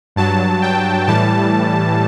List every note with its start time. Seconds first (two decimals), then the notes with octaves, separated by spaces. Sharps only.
0.16 G2 F#3 A5
0.62 G5
1.07 A2 E3 G3 A5